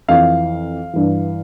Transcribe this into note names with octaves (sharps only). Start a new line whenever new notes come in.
F2 E3 F5
G2 E3